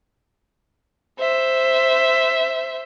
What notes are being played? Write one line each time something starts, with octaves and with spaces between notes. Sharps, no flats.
C5 E5